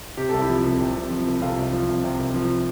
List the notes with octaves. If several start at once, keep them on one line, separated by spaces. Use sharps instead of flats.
C3 G4
C2 A4
E4 G4
F3
C2
C3
C2
F3
C2
C3 F4 A4
C2
F3
C2
C3
C2
F3